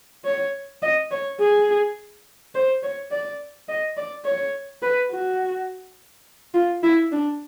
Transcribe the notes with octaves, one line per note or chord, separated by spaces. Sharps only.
C#5
D#5
C#5
G#4
C5
C#5
D5
D#5
D5
C#5
B4
F#4
F4
E4
D4